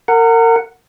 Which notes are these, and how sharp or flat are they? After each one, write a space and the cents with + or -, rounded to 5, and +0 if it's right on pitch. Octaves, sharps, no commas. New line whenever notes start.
A#4 -30 F#5 +0